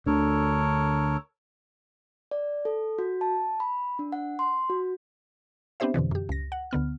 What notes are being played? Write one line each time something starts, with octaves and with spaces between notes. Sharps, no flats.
D2 D3 A4 A#4 C#5
D5
A4
F#4
A5
B5
D4
F#5
C6
F#4
B3 C4 D4 G4 C5 E5
F2 B2 D3 E3
F#2 G4
C#2 A#6
F#5
D2 D3 B3 F6